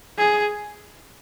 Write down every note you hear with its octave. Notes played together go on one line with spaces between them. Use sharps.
G#4